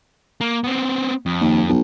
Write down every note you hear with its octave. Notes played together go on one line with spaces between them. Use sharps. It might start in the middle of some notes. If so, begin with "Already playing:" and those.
A#3
B3 C4
F2
D#2
B1